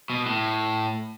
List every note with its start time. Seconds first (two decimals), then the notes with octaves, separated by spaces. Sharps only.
0.10 B2
0.26 A2